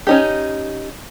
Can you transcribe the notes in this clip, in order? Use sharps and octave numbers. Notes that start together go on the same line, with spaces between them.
C#4 D#4 G4